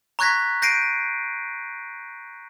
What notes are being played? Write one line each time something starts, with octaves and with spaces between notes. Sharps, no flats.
A#5 C#6 F#6 G#6 A#6 B6
G6 A#6 C7 D7 D#7